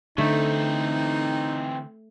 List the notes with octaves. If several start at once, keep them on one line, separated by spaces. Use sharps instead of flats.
D3 E3 A3 C4 D#4